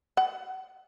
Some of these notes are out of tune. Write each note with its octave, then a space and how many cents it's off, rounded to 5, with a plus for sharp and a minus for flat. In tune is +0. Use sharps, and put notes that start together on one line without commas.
F#5 +35